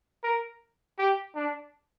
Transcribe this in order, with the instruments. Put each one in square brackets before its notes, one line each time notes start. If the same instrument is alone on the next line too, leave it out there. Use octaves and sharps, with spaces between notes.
[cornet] A#4
G4
D4